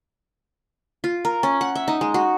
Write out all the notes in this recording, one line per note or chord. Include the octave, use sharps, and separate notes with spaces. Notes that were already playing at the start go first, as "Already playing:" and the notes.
F4
A#4
C#4
F#5
E5
D#4
G#3
F#4